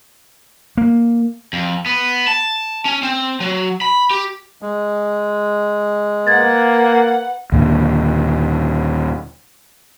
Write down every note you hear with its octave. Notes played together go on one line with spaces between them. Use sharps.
A#3
F2
B3
A5
C#4
C4
F#3
B5
G4
G#3
A#3 B4 F#5 G#6 A6
D#2 A#2 D3